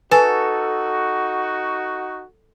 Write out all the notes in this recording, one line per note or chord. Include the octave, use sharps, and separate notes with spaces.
D#4 F#4 A4 B4 G#5